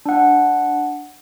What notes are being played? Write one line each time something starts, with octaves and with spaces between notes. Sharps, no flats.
D4 F#5